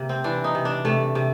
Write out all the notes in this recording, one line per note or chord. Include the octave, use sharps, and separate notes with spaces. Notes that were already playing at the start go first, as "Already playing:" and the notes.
Already playing: C3 A#3
C4
E3 D4
D#4
C3
D4
C3 A3
C3